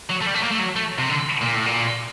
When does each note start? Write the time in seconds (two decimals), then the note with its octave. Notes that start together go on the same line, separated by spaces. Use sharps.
0.10 F#3
0.22 A3
0.27 G3
0.35 A3
0.44 A#3
0.51 A3
0.60 F#3
0.76 A3
0.99 C3
1.09 D3
1.41 A#2
1.55 A2
1.66 A#2